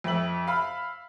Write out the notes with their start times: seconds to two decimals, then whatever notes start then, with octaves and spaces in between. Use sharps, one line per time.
0.04 F2 E5 F#7
0.47 E5 F5 B5